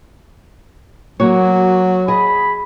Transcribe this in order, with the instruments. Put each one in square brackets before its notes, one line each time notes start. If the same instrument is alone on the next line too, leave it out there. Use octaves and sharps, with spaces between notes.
[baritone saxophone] F#3 [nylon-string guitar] A#3 F#4 C#5
[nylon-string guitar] G#4 D#5 [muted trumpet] B5